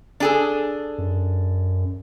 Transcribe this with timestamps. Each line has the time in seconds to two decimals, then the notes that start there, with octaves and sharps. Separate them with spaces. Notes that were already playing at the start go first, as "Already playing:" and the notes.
0.20 D4 G#4 A4
0.98 F#2